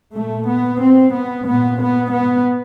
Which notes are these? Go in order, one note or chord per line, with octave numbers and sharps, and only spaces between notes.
A#2 A3
B3
C4
B3
A#2 B3
B3
B3